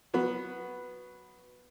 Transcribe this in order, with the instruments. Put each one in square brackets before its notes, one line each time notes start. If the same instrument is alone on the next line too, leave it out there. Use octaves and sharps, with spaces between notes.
[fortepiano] F#3 B3